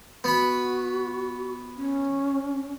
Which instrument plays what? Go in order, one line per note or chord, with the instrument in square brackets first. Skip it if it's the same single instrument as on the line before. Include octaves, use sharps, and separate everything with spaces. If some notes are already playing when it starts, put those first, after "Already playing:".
[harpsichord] B3 B5 [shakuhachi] F#4
[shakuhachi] C#4